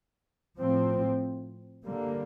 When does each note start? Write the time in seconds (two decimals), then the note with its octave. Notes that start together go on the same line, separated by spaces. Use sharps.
0.58 A2 F3 C4
1.84 D3 G3 A#3